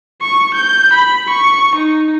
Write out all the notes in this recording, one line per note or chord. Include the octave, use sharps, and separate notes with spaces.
C#6
G6
B5
C#6
D#4